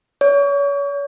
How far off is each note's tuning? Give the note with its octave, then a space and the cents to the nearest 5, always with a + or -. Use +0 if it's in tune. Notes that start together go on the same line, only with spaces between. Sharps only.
C#5 +35